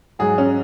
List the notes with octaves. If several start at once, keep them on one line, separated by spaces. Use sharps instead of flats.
G#2 F#3 G#4
C#4